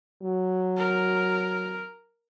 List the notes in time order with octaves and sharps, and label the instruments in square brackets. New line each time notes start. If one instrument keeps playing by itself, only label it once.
[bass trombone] F#3
[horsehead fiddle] A#4